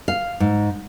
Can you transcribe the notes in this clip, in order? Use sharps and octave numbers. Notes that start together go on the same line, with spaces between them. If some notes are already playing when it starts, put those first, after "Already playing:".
F5
G#2